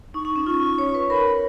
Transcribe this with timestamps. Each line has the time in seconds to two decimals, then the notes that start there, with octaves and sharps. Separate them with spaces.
0.14 D#4 C#6
0.25 D#4
0.36 C#4
0.46 F4 C#6
0.78 C#5
0.95 B4
1.10 A#4 B5